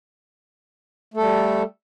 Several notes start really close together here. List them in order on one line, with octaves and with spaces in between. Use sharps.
A3 A4 G3